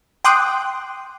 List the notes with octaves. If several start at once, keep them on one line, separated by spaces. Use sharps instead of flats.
G5 C6 D6 D#6 F#6